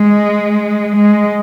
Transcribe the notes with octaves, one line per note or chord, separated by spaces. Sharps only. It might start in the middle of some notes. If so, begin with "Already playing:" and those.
Already playing: G#3
G#3